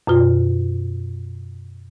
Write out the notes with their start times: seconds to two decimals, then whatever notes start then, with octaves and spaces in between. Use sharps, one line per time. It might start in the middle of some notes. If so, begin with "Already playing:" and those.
0.07 F#2 B2 F4